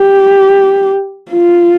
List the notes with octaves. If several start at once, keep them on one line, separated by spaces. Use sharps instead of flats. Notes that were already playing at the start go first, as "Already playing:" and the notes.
Already playing: G4
F4